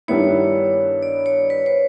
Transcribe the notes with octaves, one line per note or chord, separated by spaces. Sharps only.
G2 D#3 G3 B3 E4 C#5
D5
C#5
B4
C5